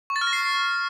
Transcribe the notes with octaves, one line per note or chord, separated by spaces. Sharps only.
C#6
A6
F6
A#6
C7